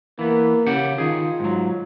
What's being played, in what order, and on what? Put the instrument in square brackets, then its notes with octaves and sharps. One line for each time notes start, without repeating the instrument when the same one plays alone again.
[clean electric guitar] E3 B3 [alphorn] A#3
[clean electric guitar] C#3 G4 F#5
[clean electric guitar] D#3 G#4 [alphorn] F4
[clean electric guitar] G#2 F#3